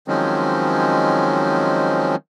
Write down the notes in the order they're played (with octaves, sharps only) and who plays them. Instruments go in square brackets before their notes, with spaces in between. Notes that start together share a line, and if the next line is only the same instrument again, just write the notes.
[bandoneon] D#3 F3 F#3 G#3 C4 C#4